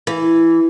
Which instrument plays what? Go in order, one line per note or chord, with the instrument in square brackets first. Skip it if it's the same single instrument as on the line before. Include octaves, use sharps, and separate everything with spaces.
[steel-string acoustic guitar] E3